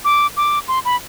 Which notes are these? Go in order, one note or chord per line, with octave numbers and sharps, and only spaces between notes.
D6
D6
C6
B5